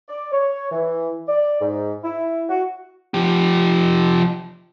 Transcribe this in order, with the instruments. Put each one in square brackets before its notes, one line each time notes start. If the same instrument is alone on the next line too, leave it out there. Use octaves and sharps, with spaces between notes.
[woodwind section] D5
C#5
E3
D5
G#2
E4
F#4
[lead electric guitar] F3 G4